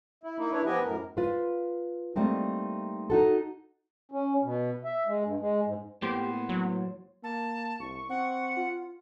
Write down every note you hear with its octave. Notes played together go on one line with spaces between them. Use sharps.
E4
A#3 D#4 E4
D4 E4 B4 C#5
F3 B3 G4 B4 D#5 G#5
F#2 A2 A#4
F4 B4 C5
G3 A3 A#3 C4 D#4
D#4 F#4 A4
C#4
B2
E5
G#3
G2
G#3
G#2
A2 A#3 B3 G4 C5
F#3
A#3 A5
C2 C#6
C4 F#5
F4